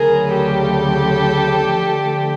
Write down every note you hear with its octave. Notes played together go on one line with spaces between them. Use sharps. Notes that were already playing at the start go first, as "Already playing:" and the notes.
Already playing: D2 C#3 F#3 G#4 A#4
G4 A4
D3 F3 A3